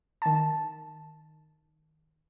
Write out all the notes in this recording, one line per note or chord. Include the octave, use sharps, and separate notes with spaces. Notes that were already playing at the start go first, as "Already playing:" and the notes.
D#3 A5